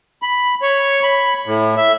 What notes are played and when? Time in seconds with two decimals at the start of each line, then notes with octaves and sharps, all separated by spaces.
0.22 B5
0.62 C#5
1.03 B5
1.46 A2
1.77 E5